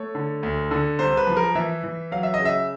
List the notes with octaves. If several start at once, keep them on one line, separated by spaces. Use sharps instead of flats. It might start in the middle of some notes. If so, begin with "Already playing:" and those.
Already playing: A3 C#5
D3
D2
D3
C2 C5
B4
F3
A#4
E3 E5
E3
F#3 F5
E5
D#5
C#3
E5